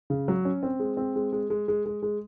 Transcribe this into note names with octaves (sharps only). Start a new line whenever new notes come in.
C#3
F#3
C#4
C4
G#3
C4
G#3
G#3
G#3
G#3
G#3
G#3